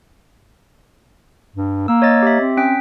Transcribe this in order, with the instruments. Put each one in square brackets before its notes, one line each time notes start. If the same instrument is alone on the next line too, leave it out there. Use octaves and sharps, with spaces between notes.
[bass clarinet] G2
[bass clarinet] A#3 [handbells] E6
[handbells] C#5 D#5 A6
G4 E5
[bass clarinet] C4
[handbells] C#4 G5 B6